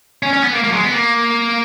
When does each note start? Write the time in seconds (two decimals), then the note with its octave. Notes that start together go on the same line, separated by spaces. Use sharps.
0.23 C#4
0.33 C#4
0.43 B3
0.53 A#3
0.64 A#3
0.69 F#3
0.74 G#3
0.83 B3
0.93 A#3